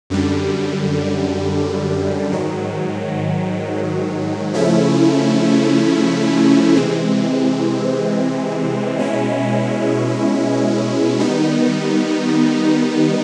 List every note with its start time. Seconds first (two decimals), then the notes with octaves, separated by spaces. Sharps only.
0.10 F#2 D3 G3
2.32 G#2 D#3 F#3
4.54 C#3 F3 A3 C#4 E4
6.76 C3 E3 G#3 C4
8.98 B2 G#3 C#4 E4
11.20 D#3 G3 B3 D#4